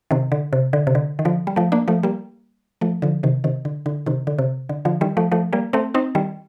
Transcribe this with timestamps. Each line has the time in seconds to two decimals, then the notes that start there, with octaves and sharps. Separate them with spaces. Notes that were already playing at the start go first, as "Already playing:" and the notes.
0.11 C3 D#3
0.32 D3
0.53 C3
0.73 D3
0.87 C3
0.95 D3
1.19 D#3
1.25 D3 F3
1.47 G3
1.56 F3 A3
1.72 A#3 D4
1.88 F3 A3
2.03 G3 A#3
2.81 F3 A3
3.02 D3 F3
3.23 C3 D#3
3.44 C3 D#3
3.65 D3
3.86 D3
4.06 C3 D#3
4.27 D3
4.39 C3
4.69 D3
4.85 D3 F3
5.01 D#3 G3
5.17 F3 A3
5.32 F3 A3
5.53 G3 A#3
5.73 A3 C4
5.94 C4 D#4
6.15 D#3 G3